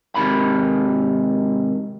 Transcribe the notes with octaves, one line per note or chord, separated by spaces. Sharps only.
G#2 C3 D#3 B5